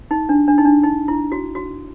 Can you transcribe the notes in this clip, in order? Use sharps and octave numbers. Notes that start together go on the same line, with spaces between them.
D#4
D4
D4
D#4
D4
D#4
E4
F#4
F#4